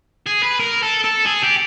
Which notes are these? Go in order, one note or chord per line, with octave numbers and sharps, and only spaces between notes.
G#4
B4
A#4
A4
A4
G#4
G4